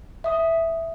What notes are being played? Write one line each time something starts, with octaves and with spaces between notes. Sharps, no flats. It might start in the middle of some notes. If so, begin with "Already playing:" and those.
E5 D#6